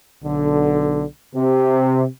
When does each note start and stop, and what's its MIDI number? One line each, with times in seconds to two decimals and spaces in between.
0.23 1.03 35
0.23 1.03 50
1.35 2.05 48